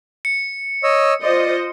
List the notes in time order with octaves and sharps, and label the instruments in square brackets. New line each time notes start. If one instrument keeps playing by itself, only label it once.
[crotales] C#7
[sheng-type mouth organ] C#5 D#5 E6
[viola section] F4 C5 D#5 [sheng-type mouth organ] D5